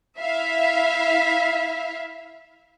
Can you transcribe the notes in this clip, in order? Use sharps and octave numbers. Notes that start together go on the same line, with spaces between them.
E4 E5 F5